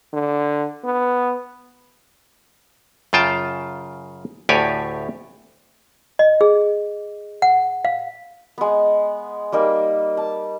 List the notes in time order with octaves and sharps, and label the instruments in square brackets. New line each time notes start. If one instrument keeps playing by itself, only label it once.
[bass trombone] D3
B3
[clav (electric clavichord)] F#2 C#3 F4 G5 A5
D2 A2 G4 C#5 D5 G#5
[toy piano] D#5
G#4
F#5
F5
[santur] G#3 B3
G3 A#3 D#4
A5